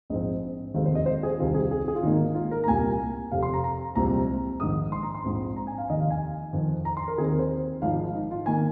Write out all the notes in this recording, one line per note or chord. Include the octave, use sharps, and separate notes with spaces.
A#1 G#2 F3 G#3 C4 D#5
F1 D#2 D#3 G#3 C4 F5
C5
D#5
C5
G#4
C2 C3 D#3 C4 F4
G#4
G#4
G#4
F4
G#1 G#2 D#3 A#3 D#4
F4
A#4
A#5
C2 A#2 A#3 G#5
F1 F2 C3 F5
C6
A#5
A#5
C2 A#2 F3 G#3 C4 A#5
A#1 G#2 D#3 D#6
C6
A#5
C6
A#1 G#2 F3 C4
A#5
G#5
F5
F1 D#2 D#3 D#5
F5
G#5
F2 D#3 C4
A#5
C6
A#4
D#2 D#3 C4 G#4
A#4
C5
G#1 G#2 F3 F5
D#4
F4
D#3 A#3 G#5